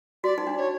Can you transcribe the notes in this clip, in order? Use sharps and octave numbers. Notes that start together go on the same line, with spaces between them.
F#4 D5
D#4
D4
C#5